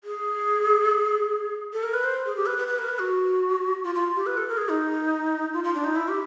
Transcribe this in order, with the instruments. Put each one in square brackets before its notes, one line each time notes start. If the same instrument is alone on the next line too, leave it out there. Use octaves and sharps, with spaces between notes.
[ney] G#4
A4
A#4
B4
C5
G#4
G4
B4
B4
B4
A#4
B4
F#4
F4
F4
G4
B4
A4
A#4
G#4
D#4
F4
F4
D4
D#4
E4
G4